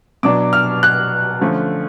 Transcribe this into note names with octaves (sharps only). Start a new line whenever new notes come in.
B2 F#3 B3 D4 D6
F6
F#6
D3 F3 A3 C#4